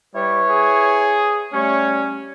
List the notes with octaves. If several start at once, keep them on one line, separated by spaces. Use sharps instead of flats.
G3 E4 B4 C#5
G#4
G3 A3 C#4 C#5